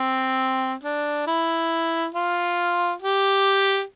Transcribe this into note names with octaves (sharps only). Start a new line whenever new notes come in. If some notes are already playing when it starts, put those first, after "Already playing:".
Already playing: C4
D4
E4
F4
G4